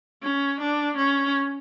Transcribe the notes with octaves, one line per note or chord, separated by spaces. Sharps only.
C#4
D4
C#4